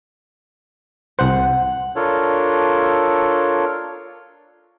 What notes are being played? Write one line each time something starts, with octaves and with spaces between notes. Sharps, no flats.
C2 C5 F#5
D4 F4 A4 A#4 C#5